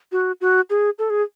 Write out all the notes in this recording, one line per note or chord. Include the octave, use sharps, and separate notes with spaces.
F#4
F#4
G#4
A4
G#4